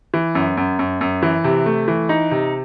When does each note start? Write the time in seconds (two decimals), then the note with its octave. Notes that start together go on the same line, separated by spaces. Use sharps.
0.14 E3
0.35 F#2
0.57 F#2
0.79 F#2
1.01 F#2
1.22 E3
1.44 C3
1.66 A3
1.88 E3
2.09 D#4
2.31 C3